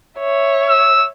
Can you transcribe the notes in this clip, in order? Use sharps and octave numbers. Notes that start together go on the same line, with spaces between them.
C#5 E5
E6